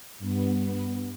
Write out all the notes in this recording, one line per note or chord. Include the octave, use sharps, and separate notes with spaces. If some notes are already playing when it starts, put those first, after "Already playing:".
G2 B3